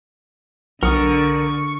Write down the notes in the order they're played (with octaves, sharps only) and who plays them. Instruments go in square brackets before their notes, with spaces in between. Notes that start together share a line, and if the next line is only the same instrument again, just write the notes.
[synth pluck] B1 [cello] D3 [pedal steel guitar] A#4 D#6 [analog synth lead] C#6